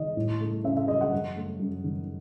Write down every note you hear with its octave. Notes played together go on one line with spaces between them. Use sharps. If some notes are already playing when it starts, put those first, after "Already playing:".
Already playing: D#3 D#5
A2
A3
C#4 E5
E5
F#3 D#5
F#5
F#2
A3
F#2
D#3